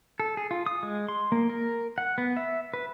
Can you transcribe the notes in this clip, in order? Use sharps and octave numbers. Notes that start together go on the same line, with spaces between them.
A4
G#4
F4
D#6
G#3
C6
A#3
A#4
F#5
B3
E5
B4